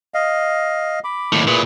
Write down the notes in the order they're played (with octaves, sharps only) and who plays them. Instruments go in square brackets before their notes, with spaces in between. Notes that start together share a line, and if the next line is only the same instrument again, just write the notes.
[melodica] D#5 F5
B5 D6
[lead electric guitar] D#2 A2
[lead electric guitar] A#2 [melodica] E4 G#4 B4